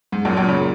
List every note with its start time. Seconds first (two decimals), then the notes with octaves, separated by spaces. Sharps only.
0.12 G#2
0.25 F#2 A#2
0.36 F#2 A#2
0.48 A#2 C#3